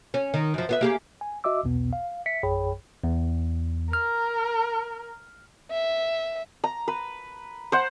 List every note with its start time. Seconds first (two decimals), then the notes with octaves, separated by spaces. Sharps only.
0.14 C#4
0.34 D#3
0.54 F#2 F3
0.69 B3 F4 E5
0.81 A#3 G4 G#4
1.21 G#5
1.44 F#4 D#5 E5 D6 E6
1.63 B1 E2 B2 B3
1.93 F5
2.26 E5 B6 C#7
2.43 A#1 F#2 G#4 C#5 G5 B5
3.04 E2
3.93 A#4 F6
5.71 E5
6.64 A#5
6.88 B4
7.72 C5 F#5